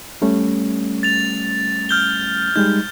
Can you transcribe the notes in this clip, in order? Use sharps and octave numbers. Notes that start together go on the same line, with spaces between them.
G3 A3 C#4
A6 F7
F6 G6 G7
G3 G#3 D#4 G6